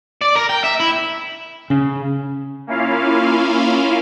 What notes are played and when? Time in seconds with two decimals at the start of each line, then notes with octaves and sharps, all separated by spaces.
0.21 D5
0.36 A#4
0.49 G5
0.64 E5
0.80 E4
1.70 C#3
2.67 A#3 C#4 E4 F4 F5